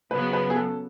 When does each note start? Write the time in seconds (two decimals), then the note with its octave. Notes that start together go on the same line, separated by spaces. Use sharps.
0.11 C#3 F#3 B3 B4
0.33 B4
0.50 G#4
0.56 A4